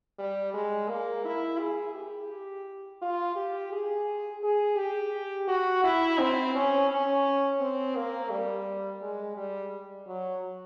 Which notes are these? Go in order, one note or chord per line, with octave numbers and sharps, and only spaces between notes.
G3
G#3
A#3
E4
G#4
G4
F4
G4
G#4
G#4
G4
F#4
E4
C4
C#4
C#4
C4
A#3
G3
G#3
G3
F#3